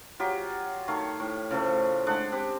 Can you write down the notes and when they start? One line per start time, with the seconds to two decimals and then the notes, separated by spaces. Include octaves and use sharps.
0.20 F#3 F4 G4
0.88 D#3 A3 C#5 F5
1.20 A2
1.51 C#3 F3 A3
2.07 G#3 D4 F#5
2.32 C4 G4